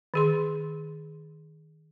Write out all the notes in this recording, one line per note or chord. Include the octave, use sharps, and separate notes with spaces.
D#3 G#4 C6